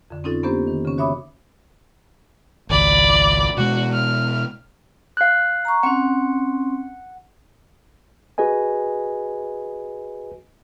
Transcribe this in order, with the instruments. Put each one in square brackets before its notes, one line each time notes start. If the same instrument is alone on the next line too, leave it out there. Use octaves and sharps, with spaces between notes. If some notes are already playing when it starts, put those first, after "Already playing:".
[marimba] F2 D3
C4 C#4 D#4 F4 A4
A#3 B3 C#4 D4 G4 C5
D#3
C#3 C#4
F#4 C#5 E5 B5 D6 D#6
[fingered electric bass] G#1 C#2 [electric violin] D5 B5
[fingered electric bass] B2 G#3 [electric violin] F#4
[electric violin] F6
[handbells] F5 F#6
[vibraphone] A#5 C#6
[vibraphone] C4 C#4 [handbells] F#5
[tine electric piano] F#4 G#4 B4 D#5 G#5